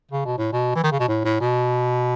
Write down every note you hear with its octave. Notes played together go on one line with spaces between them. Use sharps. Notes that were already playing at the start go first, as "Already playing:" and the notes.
C#3
B2
A2
B2
E3
D#3
C#3
B2
A2
A2
B2